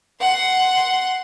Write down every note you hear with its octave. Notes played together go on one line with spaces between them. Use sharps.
F#5 C6